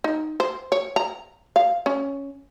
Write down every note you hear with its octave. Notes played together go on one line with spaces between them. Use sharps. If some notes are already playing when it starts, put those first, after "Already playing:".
D#4
C5
C#5
A#5
F5
C#4